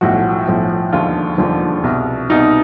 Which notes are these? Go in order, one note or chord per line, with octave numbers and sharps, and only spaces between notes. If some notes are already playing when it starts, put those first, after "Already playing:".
B1 A2 F3 F#4
B1 A2 F3
E1 D#2 D3 F3 F4
E1 D#2 D3 F3
C2 B2
C2 B2 D#4